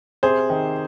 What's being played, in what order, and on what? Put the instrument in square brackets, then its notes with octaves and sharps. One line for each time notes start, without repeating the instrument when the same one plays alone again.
[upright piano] C3 G#4 C5
D#3